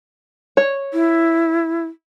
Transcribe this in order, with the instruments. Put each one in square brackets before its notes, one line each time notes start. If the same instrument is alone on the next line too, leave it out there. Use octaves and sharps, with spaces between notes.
[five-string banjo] C#5
[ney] E4